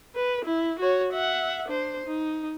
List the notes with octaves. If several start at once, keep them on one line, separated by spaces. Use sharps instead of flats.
B4
E4
F#4 C#5
E5 F#5
D4 C5
D#4